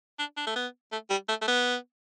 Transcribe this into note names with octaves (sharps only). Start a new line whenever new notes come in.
D4
D4
A3
B3
A3
G3
A3
A3
B3